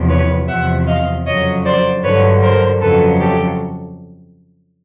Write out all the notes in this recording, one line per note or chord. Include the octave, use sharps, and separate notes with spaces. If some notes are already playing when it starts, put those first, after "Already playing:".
Already playing: E2 C3 F3
B4 C#5
E2 C3 F3 E5 F#5
D#5 F5
F2 C#3 F#3 C#5 D#5
C5 D5
G2 D3 F#3 B4 C#5
A#4 C5
F2 C#3 F#3 A4 B4
G4 A4